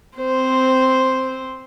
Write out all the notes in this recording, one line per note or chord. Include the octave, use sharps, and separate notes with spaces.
C4 C5